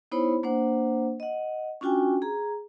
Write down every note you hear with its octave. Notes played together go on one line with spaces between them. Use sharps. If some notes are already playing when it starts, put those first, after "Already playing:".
B3 D#4 E4 C5 C#5 B5
A#3 D4 C5 F#5
D#5 F#5
C#4 D4 F4 F#4 G5 G#5
G#4 A#5